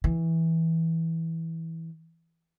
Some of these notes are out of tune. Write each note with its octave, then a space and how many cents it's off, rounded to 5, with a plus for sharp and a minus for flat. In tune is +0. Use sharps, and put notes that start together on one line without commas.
E3 -15